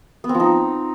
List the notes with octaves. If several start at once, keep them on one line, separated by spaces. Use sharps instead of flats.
B3
C4
F3
D#4